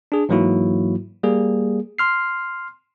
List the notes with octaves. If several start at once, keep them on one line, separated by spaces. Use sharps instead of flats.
D4 G#4
G#2 E3 F#3 A#3 E4 F#4
G3 A#3 G#4
C6 F6 C7